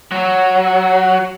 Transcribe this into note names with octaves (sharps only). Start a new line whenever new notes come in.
F#3